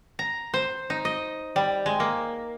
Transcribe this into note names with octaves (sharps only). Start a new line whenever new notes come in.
A#5
C5
D#4
D#5
G3
G#3
A#3